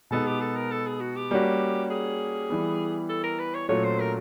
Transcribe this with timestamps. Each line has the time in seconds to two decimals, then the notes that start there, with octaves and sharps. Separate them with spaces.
0.11 B2 G#3 B3 D#4 A4
0.26 G4
0.41 A4
0.56 A#4
0.71 A4
0.86 G#4
1.00 F#4
1.16 G4
1.31 G3 A#3 C#4 F#4
1.90 G#4
2.50 E3 G3 B3
3.09 A4
3.24 A#4
3.39 B4
3.55 C#5
3.69 A#2 F#3 A3 C#4 C#5
3.84 C5
3.99 A#4